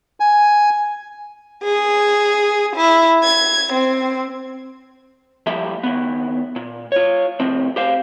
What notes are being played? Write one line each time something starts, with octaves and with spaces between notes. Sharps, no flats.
G#5
G#4
E4
G#6
C4
F3 G3 A#3 G4 E5
D#2 B3
A#2
F4 C#5
A2 C3 F3 C4
G4 C5 F5